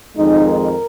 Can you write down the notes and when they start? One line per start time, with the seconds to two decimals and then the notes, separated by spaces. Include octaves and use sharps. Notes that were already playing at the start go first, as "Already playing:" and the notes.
0.16 F2 D#3 G#3 D#4
0.45 A#4